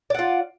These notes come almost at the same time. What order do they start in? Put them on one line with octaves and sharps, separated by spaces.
D5 F#5 F4